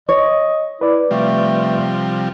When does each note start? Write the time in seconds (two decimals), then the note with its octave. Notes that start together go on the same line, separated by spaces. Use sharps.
0.09 C#5 D#5
0.81 E4 B4 D5
1.11 C3 F3 G3 A3